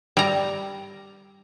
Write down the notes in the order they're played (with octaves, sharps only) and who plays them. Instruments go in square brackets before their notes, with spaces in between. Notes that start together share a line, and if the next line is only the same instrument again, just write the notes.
[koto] G3 A#5